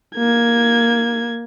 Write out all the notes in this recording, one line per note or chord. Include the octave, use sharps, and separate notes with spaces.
A#3 G#6